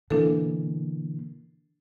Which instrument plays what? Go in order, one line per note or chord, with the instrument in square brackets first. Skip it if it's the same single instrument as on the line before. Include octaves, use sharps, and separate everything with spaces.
[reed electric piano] B2 E3 A#3 [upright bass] D3 [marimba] D4 A4